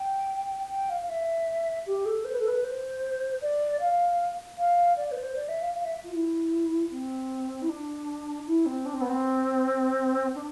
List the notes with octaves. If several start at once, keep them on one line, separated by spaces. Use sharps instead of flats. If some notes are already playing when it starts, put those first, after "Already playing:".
Already playing: G5
G5
F5
F5
E5
G4
A4
C5
B4
A4
B4
C5
D5
F5
F5
D5
B4
C5
D5
E5
F5
F5
E5
F4
E4
C4
E4
D4
E4
C4
D4
C4
B3
C4
D4